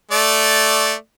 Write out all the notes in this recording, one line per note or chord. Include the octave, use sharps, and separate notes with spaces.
A3 D5